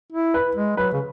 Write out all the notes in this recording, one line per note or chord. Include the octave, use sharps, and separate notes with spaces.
E4
B4
G#3
F#3 B4
C#3